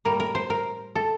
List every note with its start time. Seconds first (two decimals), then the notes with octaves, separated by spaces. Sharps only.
0.05 A2 G3 A#3 A#4
0.20 A#4
0.35 C5
0.50 A#4
0.95 A4